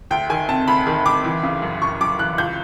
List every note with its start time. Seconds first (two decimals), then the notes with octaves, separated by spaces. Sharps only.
0.11 D2 G5
0.30 D#3 G#5
0.48 C3 A5
0.68 D2 B5
0.87 D#3
1.05 D2 D6
1.24 E3
1.43 C#3
1.62 F#2
1.82 F#2 C#6
2.01 F#2 D6
2.19 E3 F#6
2.38 C#2 G6